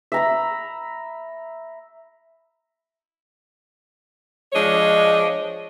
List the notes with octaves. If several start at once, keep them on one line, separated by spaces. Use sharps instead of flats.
E5 A#5 B5
F3 G#3 D4 C#5 D#5